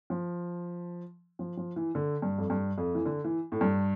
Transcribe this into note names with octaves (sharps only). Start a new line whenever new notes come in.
F3
F3
F3
E3
D3
G2
F2
G2
F2
E3
D3
E3
A2
G2